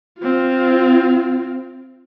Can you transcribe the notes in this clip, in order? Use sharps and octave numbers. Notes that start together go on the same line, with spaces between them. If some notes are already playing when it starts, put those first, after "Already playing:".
C4 F4